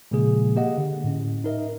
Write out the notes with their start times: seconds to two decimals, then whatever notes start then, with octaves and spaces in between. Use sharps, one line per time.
0.11 A#2 C#3 F3 G#3 A#3 G#4
0.56 A#3 G4 D#5 F#5
0.78 D3
1.04 A2 C#4
1.44 D#4 A#4 D#5 E5